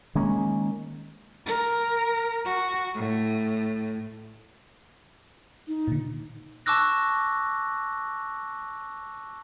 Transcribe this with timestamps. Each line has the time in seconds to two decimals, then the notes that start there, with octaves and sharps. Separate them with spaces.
0.15 D#3 G#3 A#3 C#4
1.46 A#4
2.45 F#4
2.95 A2
5.68 D#4
5.88 A#2 D3
6.66 A5 C#6 D6 E6 F#6 A#6